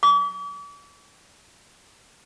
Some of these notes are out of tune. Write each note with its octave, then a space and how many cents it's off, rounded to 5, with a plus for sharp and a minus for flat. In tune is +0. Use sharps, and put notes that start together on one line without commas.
D6 -45